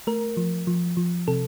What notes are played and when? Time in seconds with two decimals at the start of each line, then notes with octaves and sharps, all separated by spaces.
0.07 A3 A#4
0.37 F3
0.67 F3
0.97 F3
1.28 C3 A4